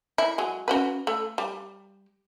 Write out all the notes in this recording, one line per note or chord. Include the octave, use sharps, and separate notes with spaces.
E4
F#3 G#3
C#4 F#4 B4
A3
G3